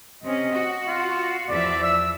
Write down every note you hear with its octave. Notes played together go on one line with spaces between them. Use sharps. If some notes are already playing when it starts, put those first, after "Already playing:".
C3 C#4 D#5
F#4
F4
E2 F3 D5 E5
E6